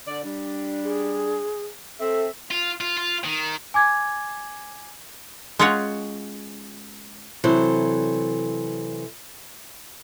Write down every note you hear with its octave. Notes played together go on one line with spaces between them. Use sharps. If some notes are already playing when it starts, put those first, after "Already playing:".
D3 D5
G3 D4
G#4
C4 A4 E5
F4
F4
F4
D#3
G#5 D6 G#6
G#3 C#4 F4 C#5 F#5
C3 E3 F#3 A4 C5